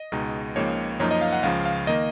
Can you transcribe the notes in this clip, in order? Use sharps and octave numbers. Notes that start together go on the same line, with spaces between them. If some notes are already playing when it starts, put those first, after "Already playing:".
Already playing: D#5
C#2 B2 G#3 D#4
C#2 C#3 F3 A#3 D#4 C#5
F#2 F3 A#3 D#4 C#5
D#5
F5
F#5
C#2 C#3 F3 F5
F5
D#3 A#3 D#5